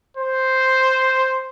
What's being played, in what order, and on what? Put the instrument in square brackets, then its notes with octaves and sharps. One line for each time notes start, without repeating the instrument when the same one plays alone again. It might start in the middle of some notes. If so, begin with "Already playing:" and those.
[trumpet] C5